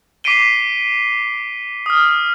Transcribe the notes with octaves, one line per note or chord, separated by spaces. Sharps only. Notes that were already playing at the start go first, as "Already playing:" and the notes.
D6 B6 C7 D7 D#7 G7
D#6 F6